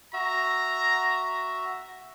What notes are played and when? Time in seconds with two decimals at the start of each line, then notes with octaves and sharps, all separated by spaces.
0.13 F#4 E5 A#5